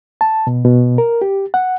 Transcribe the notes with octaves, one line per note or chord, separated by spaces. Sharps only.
A5
B2
B2
A#4
G4
F#5